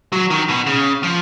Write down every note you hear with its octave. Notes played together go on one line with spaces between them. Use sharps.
F#3
D#3
B2
C#3
F3